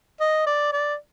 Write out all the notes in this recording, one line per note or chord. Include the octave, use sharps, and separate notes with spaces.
D#5
D5
D5